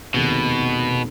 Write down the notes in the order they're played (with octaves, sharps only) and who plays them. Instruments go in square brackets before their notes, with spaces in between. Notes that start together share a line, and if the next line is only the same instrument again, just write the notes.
[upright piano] F1 D#2 D#3 G#3 C4 [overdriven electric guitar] B2